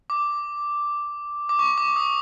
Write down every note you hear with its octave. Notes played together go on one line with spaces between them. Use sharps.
D6
D6
C#6
D6
D#6